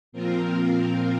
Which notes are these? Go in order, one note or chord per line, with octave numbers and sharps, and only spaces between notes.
A#2 F3 C4 F4 A#4